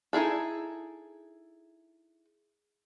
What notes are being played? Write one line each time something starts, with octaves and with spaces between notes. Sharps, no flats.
D#4 E4 G#4 A4